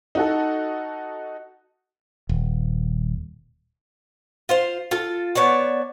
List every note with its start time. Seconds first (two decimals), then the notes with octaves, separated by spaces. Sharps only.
0.15 D#4 F#4 A4
2.29 D#1
4.49 F4 C5 F5
4.91 F4 A4
5.35 B3 C#5 D5 A5